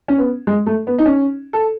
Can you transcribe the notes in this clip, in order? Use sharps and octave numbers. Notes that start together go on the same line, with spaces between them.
C#4
B3
G#3
A3
B3
D#4
C#4
A4